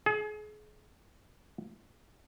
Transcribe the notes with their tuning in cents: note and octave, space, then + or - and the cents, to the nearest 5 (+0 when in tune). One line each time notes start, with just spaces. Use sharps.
G#4 +35